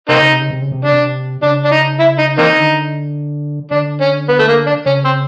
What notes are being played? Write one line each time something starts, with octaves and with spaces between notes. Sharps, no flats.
C3 A#3 C4 D#4
C#3
C3
C#3
C3
C#3
C3
C#3 D4
C3
C#3 D4
D4
D#4
E4
D#4
E3 A#3 C4 D#4
D#3
D3
D3 D4
C#4
B3
A3
A#3
D4
C#3 C#4
C4